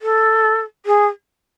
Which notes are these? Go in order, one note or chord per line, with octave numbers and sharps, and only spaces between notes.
A4
G#4